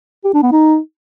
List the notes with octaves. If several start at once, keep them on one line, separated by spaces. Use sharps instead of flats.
G4
D4
B3
D#4